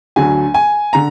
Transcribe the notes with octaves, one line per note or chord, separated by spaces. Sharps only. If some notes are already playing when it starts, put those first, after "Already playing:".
D2 D3 F#3 G#5
G#5
D3 A#5